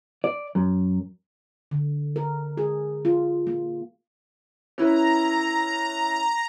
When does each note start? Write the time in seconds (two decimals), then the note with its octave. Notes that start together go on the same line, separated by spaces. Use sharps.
0.24 D5
0.55 F#2
1.71 D3
2.16 A#4
2.57 G#4
3.05 F4
3.47 A#3
4.78 C#4 E4 B4 A#5